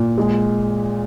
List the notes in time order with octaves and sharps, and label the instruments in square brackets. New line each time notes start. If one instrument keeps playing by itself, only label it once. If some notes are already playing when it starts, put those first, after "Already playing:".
Already playing: [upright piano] A#2
G#3